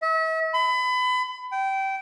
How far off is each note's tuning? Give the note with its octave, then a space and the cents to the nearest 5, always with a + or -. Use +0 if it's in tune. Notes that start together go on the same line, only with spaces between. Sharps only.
E5 -40
B5 +30
G5 -20